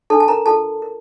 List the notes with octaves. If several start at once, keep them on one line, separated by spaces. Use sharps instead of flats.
D4 A4 A5
A5
A#4 A#5
F4 A4 A5
A#4